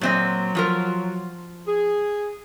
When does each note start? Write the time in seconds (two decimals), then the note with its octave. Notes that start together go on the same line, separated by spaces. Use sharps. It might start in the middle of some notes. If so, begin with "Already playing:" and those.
0.01 A#2 F#3 C4 D#5
0.55 F3 F4 A#4
1.67 G#4